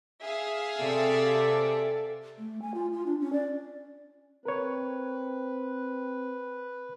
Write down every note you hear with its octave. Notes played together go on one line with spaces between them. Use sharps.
G#4 E5 F5
C3 A4 D5
A3
G#5
F4
F4
D4
C#4
D5
C4 A#4 B4 C#5